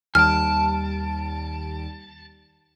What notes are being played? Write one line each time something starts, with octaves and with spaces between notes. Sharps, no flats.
D#2 G3 G#5 A5 F6 D7